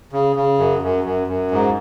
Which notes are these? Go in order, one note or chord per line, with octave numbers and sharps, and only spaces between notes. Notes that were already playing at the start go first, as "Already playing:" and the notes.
C#3
C#3
F#2
F#2
F#2
F#2
G#2